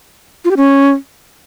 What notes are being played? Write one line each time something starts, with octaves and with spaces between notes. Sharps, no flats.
F4
G4
C#4